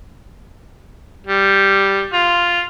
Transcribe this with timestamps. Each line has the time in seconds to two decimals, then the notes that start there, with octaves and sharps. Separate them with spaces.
1.27 G3
2.13 F4